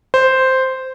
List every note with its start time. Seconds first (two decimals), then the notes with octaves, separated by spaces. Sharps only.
0.14 C5